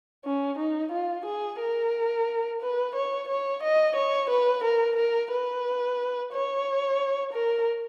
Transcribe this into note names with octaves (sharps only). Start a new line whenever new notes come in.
C#4
D#4
F4
G#4
A#4
B4
C#5
C#5
D#5
C#5
B4
A#4
A#4
B4
C#5
A#4